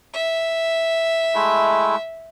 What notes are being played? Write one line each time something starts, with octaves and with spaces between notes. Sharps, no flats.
E5
G#3 A3 E4